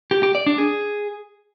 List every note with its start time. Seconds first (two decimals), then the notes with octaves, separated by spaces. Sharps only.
0.11 G4
0.23 G4
0.35 D5
0.46 D4
0.58 G#4